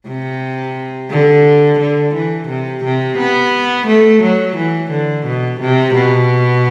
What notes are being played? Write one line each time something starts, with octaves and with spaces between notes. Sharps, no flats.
C3
D3
D3
E3
C3
C3
B3
A3
F#3
E3
D3
B2
C3
B2